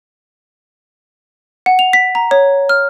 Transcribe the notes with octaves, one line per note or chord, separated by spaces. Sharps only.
F#5
F7
B6
A#5
C#5
F6